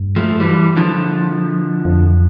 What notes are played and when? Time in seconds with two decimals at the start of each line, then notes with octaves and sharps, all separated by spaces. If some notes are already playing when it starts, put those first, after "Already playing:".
Already playing: G2
0.16 F3 A3
0.40 E3 G3
0.77 D3 F3
1.85 F2